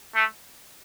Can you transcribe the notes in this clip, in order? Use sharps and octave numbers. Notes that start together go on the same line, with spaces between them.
A3